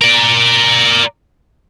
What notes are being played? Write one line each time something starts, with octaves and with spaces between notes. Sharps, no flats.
A#4 D5